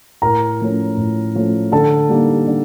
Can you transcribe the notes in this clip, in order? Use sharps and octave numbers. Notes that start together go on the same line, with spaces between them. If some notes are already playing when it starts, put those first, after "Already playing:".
A2 A#4 A#5
F3 A3 C#4
A2
F3 A3 C#4
D3 A4 A5
G3 A#3 D#4
D3